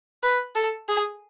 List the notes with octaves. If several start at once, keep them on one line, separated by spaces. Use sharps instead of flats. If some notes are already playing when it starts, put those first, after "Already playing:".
B4
A4
G#4